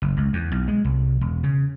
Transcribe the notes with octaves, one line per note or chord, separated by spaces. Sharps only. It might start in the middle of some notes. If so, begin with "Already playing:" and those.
F#1
C#2
E2
B1
G#3
C2
E1
C#3